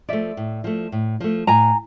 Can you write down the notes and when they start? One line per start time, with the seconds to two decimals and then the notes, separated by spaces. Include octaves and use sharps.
0.09 F3 A3 D5 E5
0.37 A2
0.64 F3 A3
0.92 A2
1.20 F3 A3
1.47 A2 G#5 A#5